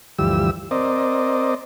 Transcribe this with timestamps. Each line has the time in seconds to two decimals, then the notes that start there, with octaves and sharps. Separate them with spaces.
0.19 D2 G2 E3 F3 G4 E6
0.71 C4 A#4 C5 D5 D#5